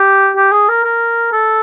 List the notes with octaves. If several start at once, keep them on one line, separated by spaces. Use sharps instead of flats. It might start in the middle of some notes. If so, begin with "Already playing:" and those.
Already playing: G4
G4
G#4
A#4
A#4
A4